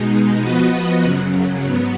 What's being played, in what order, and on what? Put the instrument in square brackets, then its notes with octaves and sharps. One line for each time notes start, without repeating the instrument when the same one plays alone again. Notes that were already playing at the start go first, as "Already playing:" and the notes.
Already playing: [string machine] B2 G#3 D#4
F3 B3 F#4 B4 D#5
F#2 C#3 F#3
G#2 F#3 B3